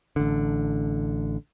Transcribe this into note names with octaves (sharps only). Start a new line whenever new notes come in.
A1 D3